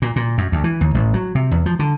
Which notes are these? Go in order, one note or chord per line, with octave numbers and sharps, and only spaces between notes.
A#2
A#2
F#2
D2
E3
D#2
A1
F#3
C3
E2
F3
D3